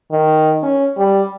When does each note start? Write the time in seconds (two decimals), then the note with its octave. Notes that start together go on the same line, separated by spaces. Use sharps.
0.11 D#3
0.63 C#4
0.97 G3